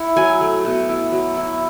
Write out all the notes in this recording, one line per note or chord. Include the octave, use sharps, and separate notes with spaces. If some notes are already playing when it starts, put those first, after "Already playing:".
Already playing: E4 F#5
F#3 G#5
A3
B2
E4
F#3
E4